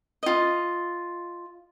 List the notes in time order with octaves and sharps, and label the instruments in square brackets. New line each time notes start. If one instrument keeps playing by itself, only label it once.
[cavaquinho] F4 D#5